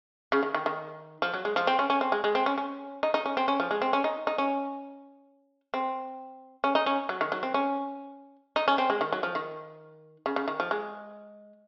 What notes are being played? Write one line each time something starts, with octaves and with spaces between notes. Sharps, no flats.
C#3
D#3
D#3
D#3
F3
F#3
G#3
F3
C4
C#4
C#4
C4
G#3
G#3
C4
C#4
C#4
D#4
D#4
C#4
C4
C#4
F3
G#3
C4
C#4
D#4
D#4
C#4
C4
C#4
D#4
C#4
F#3
D#3
F#3
C4
C#4
D#4
C#4
C4
G#3
D#3
F#3
F3
D#3
C#3
C#3
D#3
F3
G#3